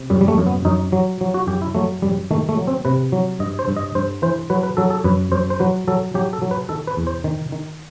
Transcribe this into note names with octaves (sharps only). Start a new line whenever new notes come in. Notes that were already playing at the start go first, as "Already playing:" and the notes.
Already playing: C3
F#2 G3
G3
A3
F#2
B3
F#2 D#4
F#3
F#3
F#4
F#2 G4
E4
F#3 A3
F#2 G3
D#3 A3
A3
F#3
C4
C3 B4
F#3
G2 D#5
C5
G2
D#5
G2 C5
E3 C5
F#3 B4
B4
F#3 A4
A4
F#2 B4
F#2 C5
C5
F#3 B4
F#3 A4
F#3 G4
A4
F#3
B4
D#3 A4
B4
E2
C5
D#3
D#3